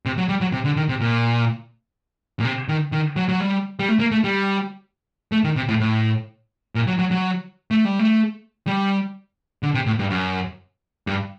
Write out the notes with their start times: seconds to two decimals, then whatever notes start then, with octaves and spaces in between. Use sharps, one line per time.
0.06 C3
0.18 F#3
0.29 G3
0.41 F#3
0.53 C3
0.65 D3
0.76 D#3
0.89 C3
1.01 A#2
2.40 A#2
2.45 C3
2.69 D#3
2.92 D#3
3.16 F#3
3.29 F#3
3.40 G3
3.79 G3
3.88 A3
4.00 A#3
4.12 A3
4.24 G3
5.32 A3
5.44 D#3
5.56 C3
5.68 A2
5.80 A2
6.75 A#2
6.87 F#3
6.99 F#3
7.11 F#3
7.71 A3
7.85 G3
7.99 A3
8.67 G3
9.63 D3
9.74 C3
9.86 A2
9.99 G2
10.10 F#2
11.07 G2